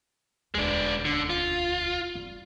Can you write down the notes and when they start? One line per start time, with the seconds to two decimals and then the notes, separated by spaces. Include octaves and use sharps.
0.55 E1 D2 G#3 D4
1.05 D3
1.30 F4
2.15 G3